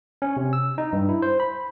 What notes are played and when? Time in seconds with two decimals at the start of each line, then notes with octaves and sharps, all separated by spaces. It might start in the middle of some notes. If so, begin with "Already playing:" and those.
0.22 C#4
0.37 C3
0.53 E6
0.78 D#4
0.93 G2
1.09 E4
1.22 C5
1.40 B5